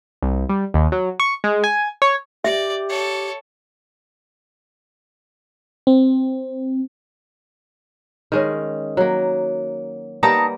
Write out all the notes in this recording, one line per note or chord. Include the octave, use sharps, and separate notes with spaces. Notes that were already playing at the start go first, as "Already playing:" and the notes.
C2
G3
D#2
F#3
C#6
G#3
G#5
C#5
G4 D5 E5
A4 C#5
C4
D#3 G#3 C#4
F#3 A#3
G3 A#3 B3 D#4 A5 A#5